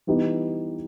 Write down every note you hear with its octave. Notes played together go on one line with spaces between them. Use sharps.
E3 G3 B3 D#4 G4